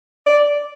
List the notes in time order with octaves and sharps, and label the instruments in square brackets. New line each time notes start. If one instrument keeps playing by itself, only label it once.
[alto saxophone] D5